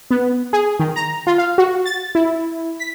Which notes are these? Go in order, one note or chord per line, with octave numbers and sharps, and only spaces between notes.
B3
G#4
D#3
A#5
F4
F5
F#4
A6
E4
B6